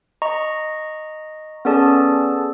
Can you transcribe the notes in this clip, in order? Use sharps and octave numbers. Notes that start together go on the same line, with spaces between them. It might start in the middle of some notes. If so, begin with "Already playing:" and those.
D#5 A#5 C#6
B3 C#4 G#4 A4 D5 A5